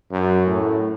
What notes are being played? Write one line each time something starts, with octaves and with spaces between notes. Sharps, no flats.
F#2
A2